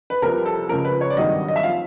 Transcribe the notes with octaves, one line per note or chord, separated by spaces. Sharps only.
B4
C2 C3 F3 A#4
A4
C#2 C#3 F3 A#4
B4
C#5
D5
G#1 G2 D#3 F#3 D#5
D#5
E5
F3 F5